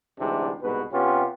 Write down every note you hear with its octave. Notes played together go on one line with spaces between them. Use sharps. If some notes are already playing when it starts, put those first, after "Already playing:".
D2 G#2 C3 E3 D4
C2 G#2 B2 B4
C3 B3 C#4 F4 G4